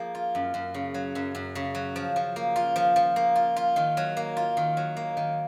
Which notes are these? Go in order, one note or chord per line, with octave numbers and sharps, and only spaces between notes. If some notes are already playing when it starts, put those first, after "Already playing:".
Already playing: F3 A#3 G#4
F4
F#2
F#2
C#3
F#3
F#2
F#2
C#3
F#3
F3
F3
A#3
F4
F3
F3
A#3
F4
F4
D#3
F#3
A#3
F4
D#3
F#3
A#3
D#3